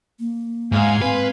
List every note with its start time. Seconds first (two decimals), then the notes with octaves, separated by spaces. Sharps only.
0.20 A#3
0.72 G#2 F5 G#5 C6
1.02 C4 B4